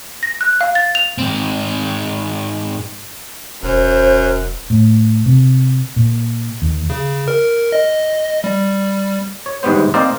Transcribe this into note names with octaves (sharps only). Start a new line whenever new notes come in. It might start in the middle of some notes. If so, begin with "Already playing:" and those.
A#6
F#6
F5
A6
F7
G#2 C4
E1 F#2 C5
A2
C3
A#2
D#2
C#3
A#4
D#5
G3
C#5
G1 D#2 G#2 G3 B3 C5
A#3 C4 A#4 C5 D5 D#5